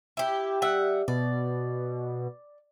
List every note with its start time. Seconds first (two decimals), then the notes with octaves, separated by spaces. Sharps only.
0.17 E4 G4
0.62 G3 E5 F#5
1.08 B2 D5